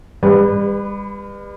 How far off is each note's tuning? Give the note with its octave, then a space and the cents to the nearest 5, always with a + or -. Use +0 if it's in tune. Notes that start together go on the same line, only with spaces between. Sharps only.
G3 +40 B4 +0